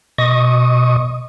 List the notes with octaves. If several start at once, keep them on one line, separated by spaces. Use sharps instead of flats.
B2 D#5 C#6 D#6